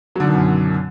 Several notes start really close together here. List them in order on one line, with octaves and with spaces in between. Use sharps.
F#3 D3 D#3 B2 F#2